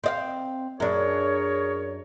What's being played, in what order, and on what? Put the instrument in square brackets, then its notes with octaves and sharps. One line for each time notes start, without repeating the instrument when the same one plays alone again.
[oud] C4 D#5 F5
[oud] F#2 D4 [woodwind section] G#4 A#4 C#5